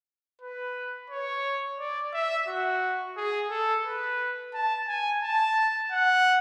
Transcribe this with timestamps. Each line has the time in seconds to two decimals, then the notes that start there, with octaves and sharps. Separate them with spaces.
0.42 B4
1.10 C#5
1.79 D5
2.13 E5
2.48 F#4
3.17 G#4
3.50 A4
3.86 B4
4.54 A5
4.88 G#5
5.23 A5
5.91 F#5